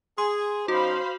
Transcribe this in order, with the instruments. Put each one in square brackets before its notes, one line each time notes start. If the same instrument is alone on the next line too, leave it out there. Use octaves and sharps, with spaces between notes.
[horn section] G#4 [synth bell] C6
[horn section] F#3 C#4 D#4 [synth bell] F#4 [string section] C5 F5 B5